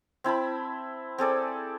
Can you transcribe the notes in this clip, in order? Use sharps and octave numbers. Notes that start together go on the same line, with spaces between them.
C4 E4 A5 B5
C4 G#4 A4 D5